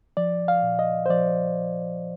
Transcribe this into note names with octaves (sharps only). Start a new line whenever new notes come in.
F3 D5
F5
A#2
D#5
C5
F3 D5